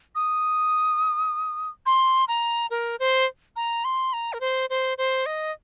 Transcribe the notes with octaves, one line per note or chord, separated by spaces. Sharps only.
D#6
C6
A#5
A#4
C5
A#5
C6
A#5
A#4
C5
C5
C5
D#5